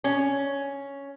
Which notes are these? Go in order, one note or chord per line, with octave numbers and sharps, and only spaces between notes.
C#4